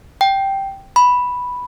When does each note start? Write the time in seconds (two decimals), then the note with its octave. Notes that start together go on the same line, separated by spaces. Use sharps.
0.21 G5
0.96 B5